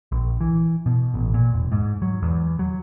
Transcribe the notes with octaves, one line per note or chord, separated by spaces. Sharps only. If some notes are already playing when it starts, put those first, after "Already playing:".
A#1
E3
B2
A1
A#2
E1
G#2
F#3
E2
F#3